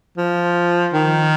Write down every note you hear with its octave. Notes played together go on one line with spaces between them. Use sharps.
F3
D#3